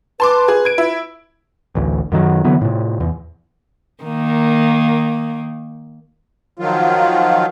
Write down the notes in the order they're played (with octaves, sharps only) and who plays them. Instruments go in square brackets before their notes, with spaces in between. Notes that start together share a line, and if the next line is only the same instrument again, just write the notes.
[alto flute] B4 [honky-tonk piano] A5 C6 D6
[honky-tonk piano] G#4
G#6 D7
E4
[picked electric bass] A1 D2
F#2 D#3 F#3
D3 E3 F#3 B3
A2 C3
E2
[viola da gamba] D#3 A#3
[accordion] D#3 F3 F#3 F4